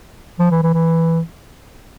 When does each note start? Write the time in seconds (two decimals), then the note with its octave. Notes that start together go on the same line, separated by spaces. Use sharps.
0.39 F3
0.51 E3
0.63 E3
0.73 E3